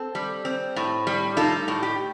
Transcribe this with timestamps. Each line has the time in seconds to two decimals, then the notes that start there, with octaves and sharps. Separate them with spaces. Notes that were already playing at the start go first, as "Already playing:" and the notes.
Already playing: C4 A4
0.15 G3
0.45 C4
0.76 A2
1.07 G3
1.37 D#4 F4 A4
1.68 A2
1.83 G4